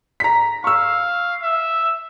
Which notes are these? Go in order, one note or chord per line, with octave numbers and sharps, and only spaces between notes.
A#5 B6
F5 C#6 E6
E5